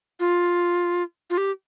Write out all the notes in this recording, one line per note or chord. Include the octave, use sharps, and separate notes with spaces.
F4
F4
G4